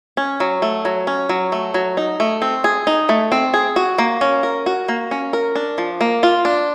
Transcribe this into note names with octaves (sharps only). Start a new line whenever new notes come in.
C#4
F#3
A3
F#3
C#4
F#3
A3
F#3
D#4
A3
C4
G#4
D#4
A3
C4
G#4
F#4
A#3
C#4
A#4
F#4
A#3
C#4
A#4
D4
F3
A#3
F4
D4